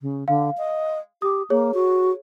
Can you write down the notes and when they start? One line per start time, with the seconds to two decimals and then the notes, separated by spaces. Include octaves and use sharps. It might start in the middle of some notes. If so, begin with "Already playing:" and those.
0.01 C#3
0.28 D3 F5
0.57 D#5
1.22 G4 D#6
1.50 A#3 G#4 C#5
1.74 F#4